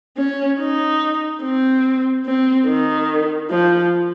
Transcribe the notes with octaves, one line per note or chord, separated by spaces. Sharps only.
C#4
D#4
C4
C4
D#3
F3